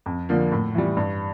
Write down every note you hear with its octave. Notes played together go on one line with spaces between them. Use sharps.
F2
D3 F3 A#3
A2
E3 G3
G2